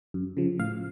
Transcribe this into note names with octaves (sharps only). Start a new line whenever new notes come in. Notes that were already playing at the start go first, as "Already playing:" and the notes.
F#2
C#3 F3
A2 F5